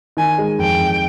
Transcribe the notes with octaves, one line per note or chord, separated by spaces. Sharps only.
D#3 G#5
G#3
F2 G5
F2